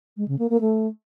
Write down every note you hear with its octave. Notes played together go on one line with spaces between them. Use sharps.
G#3
C#3
A#3
A#3
A3